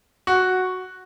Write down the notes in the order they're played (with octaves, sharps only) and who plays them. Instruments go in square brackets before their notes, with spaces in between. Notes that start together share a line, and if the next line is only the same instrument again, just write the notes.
[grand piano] F#4